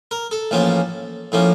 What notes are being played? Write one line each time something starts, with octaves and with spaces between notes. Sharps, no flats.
A#4
A4
A1 A2 F3 A#3 C#4
A2 F3 A#3 C#4